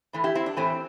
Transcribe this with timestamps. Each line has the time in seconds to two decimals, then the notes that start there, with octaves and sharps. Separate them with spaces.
0.13 A2 E3 A3
0.24 E4 G4
0.35 C4 E4
0.46 D4
0.56 A2 E3 A3 C4